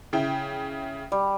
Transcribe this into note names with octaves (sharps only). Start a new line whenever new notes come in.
C#3 E4 G5
G3